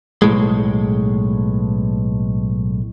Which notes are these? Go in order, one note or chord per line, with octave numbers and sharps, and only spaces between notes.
B1 A2 G#3